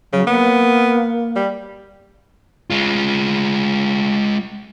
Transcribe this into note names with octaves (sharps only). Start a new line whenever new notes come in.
C#3 F#3
A#3 B3
G3
G#3 F4